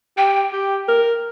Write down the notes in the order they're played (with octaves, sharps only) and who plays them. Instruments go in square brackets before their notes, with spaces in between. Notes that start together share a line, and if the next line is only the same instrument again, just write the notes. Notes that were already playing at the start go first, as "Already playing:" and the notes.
[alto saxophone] G4 [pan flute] G5
[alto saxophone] G4
A#4